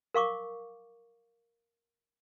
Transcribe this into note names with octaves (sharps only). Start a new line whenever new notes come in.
A#4 F5 C#6 D6